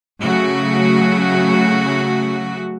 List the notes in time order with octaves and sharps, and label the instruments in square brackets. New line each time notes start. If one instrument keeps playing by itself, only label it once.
[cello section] C#3 F#3 A3 F#4